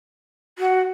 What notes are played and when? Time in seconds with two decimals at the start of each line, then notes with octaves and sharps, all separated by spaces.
0.58 F#4